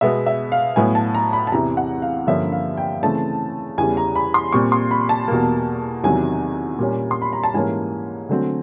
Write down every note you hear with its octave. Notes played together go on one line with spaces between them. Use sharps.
B2 G#3 B3 E5
E5
F5
A2 F#3 B3 G#5
A5
A#5
B5
A5
E2 C3 E3 A#5
F#5
F5
G2 D3 F3 A#3 C#4 E5
F5
G5
C#3 E3 A3 C4 A5
E2 C#3 E3 G3 G#5
A#5
B5
C6
A#2 G3 C4 C#6
C6
B5
A5
E2 B2 G3 A#3
E2 C3 D#3 F#3 G#5
A#2 G3 A#3 C#4
C6
B5
A#5
A5
G#2 E3 G3 A#3 C#4 G#5
D3 F#3 A3 C4